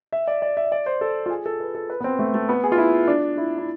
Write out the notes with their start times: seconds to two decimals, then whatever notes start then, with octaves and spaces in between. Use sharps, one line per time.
0.13 E5
0.28 D5
0.42 D5
0.57 E5
0.72 D5
0.86 C5
1.01 A4
1.26 F4
1.30 G#4
1.46 A4
1.60 B4
1.75 A4
1.90 B4
2.01 B3
2.04 C4
2.19 A3
2.34 A3
2.49 B3
2.64 G#4
2.72 F4
2.78 E4
3.07 D4
3.37 E4
3.58 E4